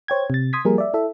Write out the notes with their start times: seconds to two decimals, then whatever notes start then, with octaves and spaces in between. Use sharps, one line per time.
0.08 C5 C#5 G5 G#6
0.30 C3 A6
0.53 C6 D#6 G#6 B6
0.65 F3 G3 A#3 G#4 A#4
0.78 D5 E5
0.94 E4 A4 E5